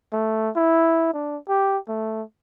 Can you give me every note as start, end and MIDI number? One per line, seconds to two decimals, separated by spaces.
0.13 0.50 57
0.56 1.11 64
1.13 1.37 62
1.48 1.78 67
1.88 2.22 57